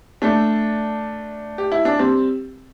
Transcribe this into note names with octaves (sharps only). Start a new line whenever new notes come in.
A3 D4
G4
E4
D4
G3 C4